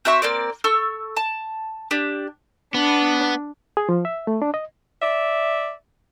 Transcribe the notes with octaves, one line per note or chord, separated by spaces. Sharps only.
C4 F#4 E5 C#6
A#3 C4 D5
A4 C#6 E6
A5
D4 G4
B3 D4
G#4
F3
E5
A3
D4
D#5
D5 E5